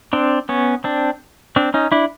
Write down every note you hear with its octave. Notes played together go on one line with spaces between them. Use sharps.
C4 D4
B3 C#4
C4 D4
C4 D4
C#4 D#4
D4 E4